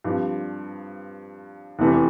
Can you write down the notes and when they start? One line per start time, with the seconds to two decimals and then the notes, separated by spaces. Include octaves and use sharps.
0.04 G2 F3 C4
1.79 F1 E2 C3 E3 A3